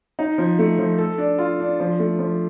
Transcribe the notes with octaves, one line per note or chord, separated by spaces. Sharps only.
D#4
F3
A3
F3
A4
D4
F4
D4
F3
A3
F3